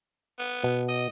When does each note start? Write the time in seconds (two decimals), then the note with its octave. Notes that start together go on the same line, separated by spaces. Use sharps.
0.40 B3
0.64 B2
0.89 D#5